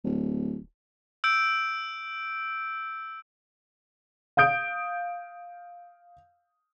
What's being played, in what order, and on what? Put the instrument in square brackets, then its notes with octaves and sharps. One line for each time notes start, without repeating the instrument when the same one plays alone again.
[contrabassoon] D1
[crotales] E6 G6 D7
[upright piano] F5 D#6 G6 D7